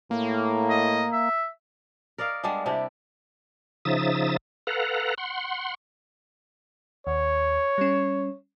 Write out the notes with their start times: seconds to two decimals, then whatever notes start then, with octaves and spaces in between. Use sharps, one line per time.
0.11 A2 A#3
0.70 D#5
1.13 E5
2.18 A#4 D5 D#5 F5
2.43 G3 G#3 B3 D4
2.66 C3 D4 E4 G4
3.85 C#3 F3 D#4 E5 D#6 A6
4.67 A4 B4 F5 F#5 A#5
5.18 F#5 C6
7.07 D#2 C#5
7.78 G3 C#4